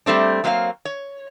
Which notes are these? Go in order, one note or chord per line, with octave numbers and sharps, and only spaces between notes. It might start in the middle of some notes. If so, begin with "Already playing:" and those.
G3 A3 C4 D4
F#3 A#3 C4 D#5 F5
C#5